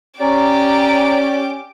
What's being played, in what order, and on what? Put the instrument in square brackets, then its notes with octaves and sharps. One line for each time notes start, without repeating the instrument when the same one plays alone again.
[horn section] C#4 [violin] G4 D6 [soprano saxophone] D5 [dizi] A#5